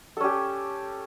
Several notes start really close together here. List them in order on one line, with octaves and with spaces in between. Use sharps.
A4 C#4 G4